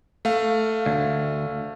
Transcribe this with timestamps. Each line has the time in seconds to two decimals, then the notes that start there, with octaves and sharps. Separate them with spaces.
0.25 A3 F5
0.86 D2